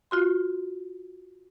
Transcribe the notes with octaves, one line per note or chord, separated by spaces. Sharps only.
F4 F#4 C6